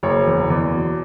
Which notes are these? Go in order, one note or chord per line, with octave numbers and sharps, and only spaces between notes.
F#1 C#5
E2
E2
B2